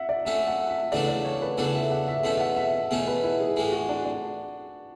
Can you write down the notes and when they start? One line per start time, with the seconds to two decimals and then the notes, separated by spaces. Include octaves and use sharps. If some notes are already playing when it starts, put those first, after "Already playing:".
Already playing: E5 F#5
0.09 D5
0.25 F#3 A3 C#4 E5
0.48 F#5
0.69 E5
0.92 E2 C#3 F#3 A3 D4 D5
1.08 D5
1.25 C#5
1.42 B4
1.58 E2 C#3 F#3 A3 D4 A4
1.75 E5
1.92 F#5
2.08 E5
2.24 E2 B2 A3 C#4 E5
2.40 F#5
2.57 E5
2.91 E2 B2 A3 C#4
3.07 B4
3.23 E4
3.40 G#4
3.56 A2 E3 G#3 G#4
3.72 F#4
3.89 D4
4.05 D4